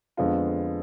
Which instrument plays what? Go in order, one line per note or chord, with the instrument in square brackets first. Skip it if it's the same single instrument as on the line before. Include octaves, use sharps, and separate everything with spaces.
[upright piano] F2 D3 G#3 B3 F4